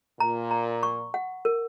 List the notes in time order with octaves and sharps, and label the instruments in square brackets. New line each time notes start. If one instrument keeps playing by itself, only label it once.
[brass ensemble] A#2 [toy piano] A#5
[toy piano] A#5
C#6
F#5
A#4